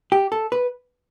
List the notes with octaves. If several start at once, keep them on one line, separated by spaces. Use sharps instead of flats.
G4
A4
B4